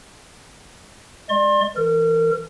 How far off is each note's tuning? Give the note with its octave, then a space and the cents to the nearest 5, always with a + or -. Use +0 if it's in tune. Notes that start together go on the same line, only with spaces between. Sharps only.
G#3 +0 D5 +20 C6 +30
E3 +0 A#4 -35